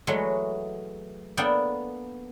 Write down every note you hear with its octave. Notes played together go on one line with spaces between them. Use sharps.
E3 F#3 G#3 A3 F#4
A#3 B3 D4 A4 G5